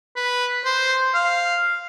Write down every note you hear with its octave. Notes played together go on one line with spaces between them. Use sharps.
B4
C5
F5